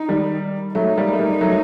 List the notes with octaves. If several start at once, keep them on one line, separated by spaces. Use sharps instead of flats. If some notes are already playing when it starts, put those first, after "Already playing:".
Already playing: D#4
D#3 G3
F#3 A3 D#4
G3 A#3
A3
G3 A#3
F#3 A3